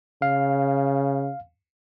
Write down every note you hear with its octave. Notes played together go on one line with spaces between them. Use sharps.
C#3 F5